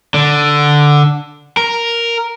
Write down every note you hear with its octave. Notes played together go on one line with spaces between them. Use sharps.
D3
A#4